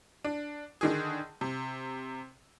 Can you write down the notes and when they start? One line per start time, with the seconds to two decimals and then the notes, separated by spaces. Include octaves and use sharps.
0.24 D4
0.81 D3 D#3 G#4
1.41 C3